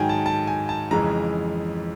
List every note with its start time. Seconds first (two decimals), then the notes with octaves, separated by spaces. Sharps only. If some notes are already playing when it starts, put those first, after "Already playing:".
Already playing: G#2 D#3 F#3 G5 G#5
0.09 A5
0.26 A5
0.47 G#5
0.69 A5
0.91 F2 C#3 E3 G#3 A#5